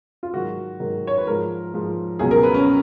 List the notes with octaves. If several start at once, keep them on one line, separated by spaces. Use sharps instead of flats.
F4
G#2 D#3 F#3 F#4
G#2 D#3 F#3
C#5
B4
G#2 F3 A#4
G#2 F3
C#2 B2 F#3 G#4
A#4
B4
C#4